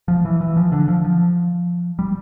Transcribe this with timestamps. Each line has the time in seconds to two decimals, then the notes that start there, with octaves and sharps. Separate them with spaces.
0.08 F3
0.25 E3
0.41 E3
0.57 F3
0.72 D3
0.88 F3
1.04 F3
1.99 G3